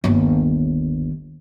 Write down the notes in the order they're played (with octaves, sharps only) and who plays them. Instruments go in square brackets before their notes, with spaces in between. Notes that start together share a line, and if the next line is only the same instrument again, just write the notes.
[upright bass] G1 D#2